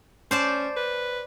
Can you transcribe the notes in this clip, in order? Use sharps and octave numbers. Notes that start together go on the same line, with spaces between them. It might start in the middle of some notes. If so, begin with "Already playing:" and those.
C#4 C5 D5 A5
B4